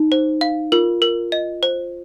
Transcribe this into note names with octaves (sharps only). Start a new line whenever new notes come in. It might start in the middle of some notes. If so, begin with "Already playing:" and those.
Already playing: D#4
C5
F5
F4 A#4
A#4
D#5
C5